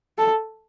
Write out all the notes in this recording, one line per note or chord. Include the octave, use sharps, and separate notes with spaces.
A4